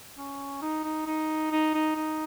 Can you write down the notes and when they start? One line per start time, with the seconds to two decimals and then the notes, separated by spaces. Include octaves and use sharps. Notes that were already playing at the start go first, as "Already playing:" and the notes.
0.18 C#4
0.62 D#4
0.84 D#4
1.06 D#4
1.51 D#4
1.74 D#4
1.96 D#4